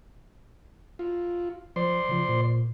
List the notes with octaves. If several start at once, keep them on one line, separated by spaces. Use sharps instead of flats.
F4
F3 C5 D5 C6
C#3 F3
A#2